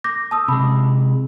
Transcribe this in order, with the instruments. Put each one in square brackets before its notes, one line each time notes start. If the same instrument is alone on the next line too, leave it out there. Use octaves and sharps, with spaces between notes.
[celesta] D6 G6 A#6
A5 D#6 E6
[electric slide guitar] C3 G#3 [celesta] B5